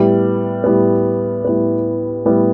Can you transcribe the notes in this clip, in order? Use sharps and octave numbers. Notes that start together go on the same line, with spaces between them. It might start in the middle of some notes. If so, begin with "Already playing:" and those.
Already playing: A2 G3 B3
A2 G3 B3
A2 G3 B3
A2 G3 B3